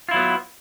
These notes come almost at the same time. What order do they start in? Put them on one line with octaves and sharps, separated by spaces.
F4 E4 F#3 B3